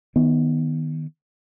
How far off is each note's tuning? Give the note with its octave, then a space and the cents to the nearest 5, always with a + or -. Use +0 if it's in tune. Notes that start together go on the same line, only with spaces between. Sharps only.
D#3 +0 B3 -10